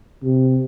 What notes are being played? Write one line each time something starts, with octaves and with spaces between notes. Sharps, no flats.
C3